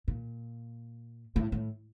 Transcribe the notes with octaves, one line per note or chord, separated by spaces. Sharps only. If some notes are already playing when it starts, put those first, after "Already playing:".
A#2
A2
A2